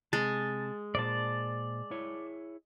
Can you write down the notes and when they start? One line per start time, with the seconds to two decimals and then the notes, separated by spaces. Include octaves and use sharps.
0.13 C3 G#3 A5
0.95 A#2 C5 D5 A5
1.91 E4 G#4 C#5